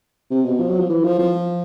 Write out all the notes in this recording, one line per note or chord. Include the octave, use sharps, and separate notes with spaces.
C3
B2
F3
F#3
F3
E3
F3
F3